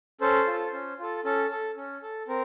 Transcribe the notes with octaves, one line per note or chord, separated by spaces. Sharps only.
C#4 A4 C5
F4 A4
C#4
F4 A4
C#4 A4
A4
C#4
A4
C4 A#4